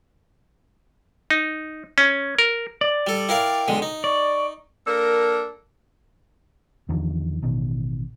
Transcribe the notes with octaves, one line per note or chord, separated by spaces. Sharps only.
D#4
C#4
A#4
D5
G3 A4
E4 A#4 F5 G5
B1 D3 G#3
D#4
D5 C#6
A#3 D4 A4 A#4
E2 D3 D#3 F3
A1 B2 D#3